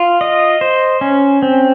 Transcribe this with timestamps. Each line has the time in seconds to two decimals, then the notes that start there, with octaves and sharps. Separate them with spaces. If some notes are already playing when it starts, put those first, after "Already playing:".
Already playing: F4
0.21 D#5
0.61 C5
1.01 C#4
1.42 C4